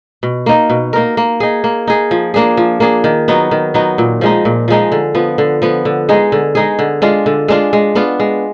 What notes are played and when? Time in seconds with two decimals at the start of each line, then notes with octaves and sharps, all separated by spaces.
0.23 B2
0.46 A#3 D#4 A#4
0.70 B2
0.93 A#3 D#4 A#4
1.17 A#3
1.40 D#4 G#4
1.64 A#3
1.87 D#4 G#4
2.11 F3
2.34 A#3 D4 G#4
2.57 F3
2.80 A#3 D4 G#4
3.04 D#3
3.28 F#3 B3 D#4
3.51 D#3
3.74 F#3 B3 D#4
3.98 A#2
4.21 F3 G#3 D#4
4.45 A#2
4.68 F3 G#3 D#4
4.92 D3
5.15 F3 B3
5.38 D3
5.62 F3 B3
5.85 D3
6.09 G#3 D#4 G#4
6.32 D3
6.55 G#3 D#4 G#4
6.79 D3
7.02 G#3 D4 F4
7.26 D3
7.48 G#3 D4 F4
7.73 G#3
7.95 B3 D4 F4
8.20 G#3